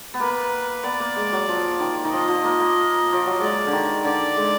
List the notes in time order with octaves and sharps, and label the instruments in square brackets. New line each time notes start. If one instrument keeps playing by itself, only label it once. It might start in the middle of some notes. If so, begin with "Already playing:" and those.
[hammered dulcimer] B3
[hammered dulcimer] A#3 [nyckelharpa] B4
[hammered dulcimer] B3 [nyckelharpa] D5
[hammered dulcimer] A#3
G#3
F#3
F3
D#3
D#3
[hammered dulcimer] F3 [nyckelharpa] D#5
[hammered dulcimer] F3
A#3
A#3
F3
F#3
[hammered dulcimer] G#3 [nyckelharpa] D5
[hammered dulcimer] D3
D#3
[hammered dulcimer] D3 [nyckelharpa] D5
[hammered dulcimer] G#3